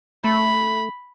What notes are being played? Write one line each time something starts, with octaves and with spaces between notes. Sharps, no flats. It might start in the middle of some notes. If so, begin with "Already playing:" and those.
A3 B5